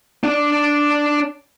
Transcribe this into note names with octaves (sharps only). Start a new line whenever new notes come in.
D4 D5